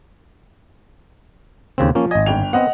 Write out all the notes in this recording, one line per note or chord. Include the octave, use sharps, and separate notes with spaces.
D#2 C#3 C4
F3 A#3 C#4
G#1 D#5 G#5
G1 G5 F7
B3 C4 D#5 F#5